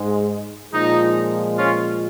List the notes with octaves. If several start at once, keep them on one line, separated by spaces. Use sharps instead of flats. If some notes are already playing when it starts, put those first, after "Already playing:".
Already playing: G#2 G#3
A#2 F3 G#3 D#4
C#4 F4